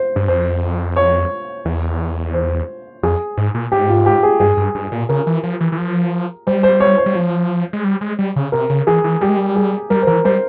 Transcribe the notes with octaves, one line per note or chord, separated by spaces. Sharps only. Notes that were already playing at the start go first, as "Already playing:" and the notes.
Already playing: C5
G2
F2 C5
C#5
E2
C5
F2 G#4
G#2
A#2
G#2 G4
F4
G4
G#4
G2 G#4
G2
G2
A#2
C#3 A#4
E3
F3
E3
E3
F3
G3 C5
C5
C#5
C5
G3
F3
G#3
G3
G#3
G3
C#3
C3 A#4
C#3
E3 G#4
E3
G3 G4
G#3
G3
G#4
G3 A#4
C5
E3 A#4
G3 C5